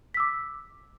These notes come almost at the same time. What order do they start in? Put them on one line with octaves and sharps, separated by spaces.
B6 E6 D6